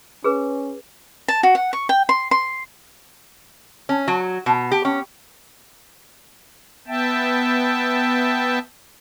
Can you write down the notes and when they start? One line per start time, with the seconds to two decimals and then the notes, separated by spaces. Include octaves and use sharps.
0.24 C#4 G#4 B4
1.28 A5
1.43 F#4
1.55 F#5
1.73 C#6
1.89 G5
2.09 C6
2.31 C6
3.89 C#4
4.08 F#3
4.46 B2
4.72 G4
4.85 C#4
6.88 B3 E5 G5 A5